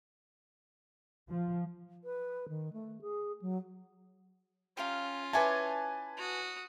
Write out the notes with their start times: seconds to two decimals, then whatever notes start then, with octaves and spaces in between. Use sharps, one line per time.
1.29 F3
2.04 B4
2.49 D#3
2.73 A3
3.01 G#4
3.41 F#3
4.77 C#4 F4 G4 A#4 F5
5.33 E4 B4 C#5 G#5 A5 D6
6.18 F#4 D#6